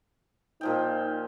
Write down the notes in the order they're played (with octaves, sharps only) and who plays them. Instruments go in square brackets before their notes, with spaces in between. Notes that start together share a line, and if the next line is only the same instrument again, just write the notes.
[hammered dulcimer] A#2 F3 G5 [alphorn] D#4